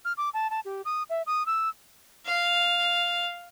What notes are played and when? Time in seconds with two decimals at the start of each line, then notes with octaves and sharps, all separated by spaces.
0.05 F6
0.17 D6
0.34 A5
0.51 A5
0.65 G4
0.85 D#6
1.10 E5
1.27 D#6
1.46 E6
2.26 F5